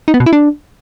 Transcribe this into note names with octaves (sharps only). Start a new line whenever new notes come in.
D#4
B3
B2
E4
D4